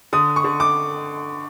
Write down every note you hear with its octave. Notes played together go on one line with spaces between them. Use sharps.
D3 D#6
C#6
D3
D6